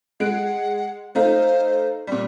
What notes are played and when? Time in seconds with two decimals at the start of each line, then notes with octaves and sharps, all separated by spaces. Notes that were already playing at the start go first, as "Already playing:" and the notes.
0.20 G#3 F#5 F#6 D7
1.15 A3 D#4 C5 F5
2.07 A#2 G3